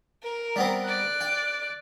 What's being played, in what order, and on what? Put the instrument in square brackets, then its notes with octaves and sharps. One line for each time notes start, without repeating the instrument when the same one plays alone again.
[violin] A#4
[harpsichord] G3 B3 C4
[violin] D5 F#6
[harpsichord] G5